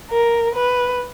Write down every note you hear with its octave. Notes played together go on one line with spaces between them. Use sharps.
A#4
B4